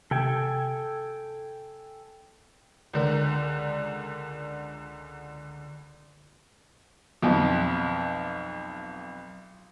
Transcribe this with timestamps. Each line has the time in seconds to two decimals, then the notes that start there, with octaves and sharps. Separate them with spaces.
0.11 C3 A4 G5 G#5
2.93 C#2 D3 A#4
7.22 B1 F2